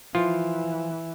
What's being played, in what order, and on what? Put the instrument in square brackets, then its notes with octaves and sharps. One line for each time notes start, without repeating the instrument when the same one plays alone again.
[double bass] E3 [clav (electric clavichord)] F3 F4